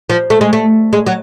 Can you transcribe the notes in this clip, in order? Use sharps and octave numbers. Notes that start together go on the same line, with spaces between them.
F3
A3
G#3
A3
G#3
F#3